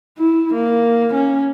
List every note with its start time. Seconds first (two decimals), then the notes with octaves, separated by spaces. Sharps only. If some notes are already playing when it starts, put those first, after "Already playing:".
0.18 E4
0.54 A#3
1.14 C#4